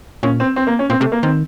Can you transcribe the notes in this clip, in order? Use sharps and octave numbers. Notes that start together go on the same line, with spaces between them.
A#2 C#4
C4
C4
A#3
C#4
A#2 C4
C3 A3
A#3
D#3 C4